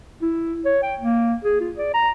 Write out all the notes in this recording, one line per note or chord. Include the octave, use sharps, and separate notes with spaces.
E4
C#5
G5
A#3
G#4
F4
D5
A#5